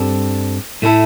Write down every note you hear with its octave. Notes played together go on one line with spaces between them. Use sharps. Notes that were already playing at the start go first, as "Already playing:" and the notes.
Already playing: G2 G3 C4 A4
A2 A3 E4 A4